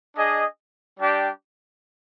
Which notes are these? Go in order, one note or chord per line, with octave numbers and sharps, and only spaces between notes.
D4 G#4 D#5
G3 D4 G4 D5 G5